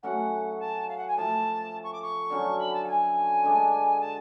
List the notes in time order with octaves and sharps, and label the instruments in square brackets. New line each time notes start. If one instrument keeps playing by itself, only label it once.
[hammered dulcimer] A2 F#3 C#4 F#4 [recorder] F#5
[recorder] A5
F5
F#5
G#5
[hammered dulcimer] A2 F3 A3 F4 [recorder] A5
[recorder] C#6
D6
C#6
[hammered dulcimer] D3 F#3 C#4 F#4
[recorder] B5
A5
F#5
G#5
[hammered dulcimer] D3 G#3 D4
[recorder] A5